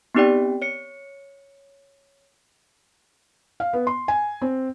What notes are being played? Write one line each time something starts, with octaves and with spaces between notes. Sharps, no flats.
B3 C4 D#4 G4 D5 G5
C#5 C#7
F5
B3
C6
G#5
C4